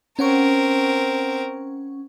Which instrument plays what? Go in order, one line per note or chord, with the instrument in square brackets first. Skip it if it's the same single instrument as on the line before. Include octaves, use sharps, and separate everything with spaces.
[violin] C4 A#4 [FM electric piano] C#4 F#5 C#6